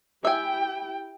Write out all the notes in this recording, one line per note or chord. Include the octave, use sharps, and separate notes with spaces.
E4 G4 E5 G5 G#5